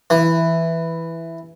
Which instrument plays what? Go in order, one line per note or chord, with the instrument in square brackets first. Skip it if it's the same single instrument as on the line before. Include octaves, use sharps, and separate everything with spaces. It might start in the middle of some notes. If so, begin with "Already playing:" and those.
[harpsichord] E3